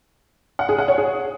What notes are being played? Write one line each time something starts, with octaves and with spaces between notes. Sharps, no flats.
F#5
G#4
F#5
C#5
G#4